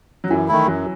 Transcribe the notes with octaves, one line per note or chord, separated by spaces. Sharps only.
F#3
F#2 E3
D#3 A3 E4
F#2 F#3